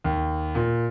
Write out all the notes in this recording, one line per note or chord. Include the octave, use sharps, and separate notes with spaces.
D#2
A#2